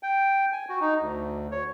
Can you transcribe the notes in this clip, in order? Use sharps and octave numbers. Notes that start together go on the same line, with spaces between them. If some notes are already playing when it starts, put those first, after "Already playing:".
G5
G#5
F#4
D#4
D2
C#5